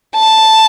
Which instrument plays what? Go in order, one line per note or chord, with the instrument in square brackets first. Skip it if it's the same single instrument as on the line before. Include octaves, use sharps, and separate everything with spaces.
[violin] A5